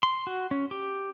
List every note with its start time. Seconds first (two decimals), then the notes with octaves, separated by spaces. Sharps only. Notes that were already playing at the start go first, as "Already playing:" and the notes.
0.03 C6
0.27 F#4
0.51 C#4
0.71 G4